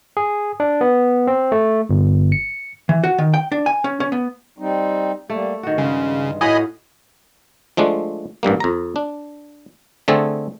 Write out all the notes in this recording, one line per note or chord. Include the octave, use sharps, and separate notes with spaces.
G#4
D4
B3
C4
A3
G1
C#7
E3
F#4
D#3
G5
D4
G#5
C#4
C#4
B3
G3 C4 D#4
G3 A3 A#3
G2 D#3 F#4
C#3 G#3
A2 F#4 D#5 F5 G#5 B5
F3 G#3 A3 D4
A1 G2 G3 A#3
F2 A#5
D4
D3 A3 C4 G#4 A4